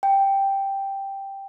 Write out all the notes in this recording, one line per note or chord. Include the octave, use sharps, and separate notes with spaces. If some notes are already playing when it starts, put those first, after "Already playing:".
G5